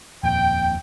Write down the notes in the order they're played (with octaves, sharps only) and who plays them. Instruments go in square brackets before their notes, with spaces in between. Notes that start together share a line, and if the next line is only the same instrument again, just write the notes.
[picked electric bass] D#1 F2 A#2 [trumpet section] G5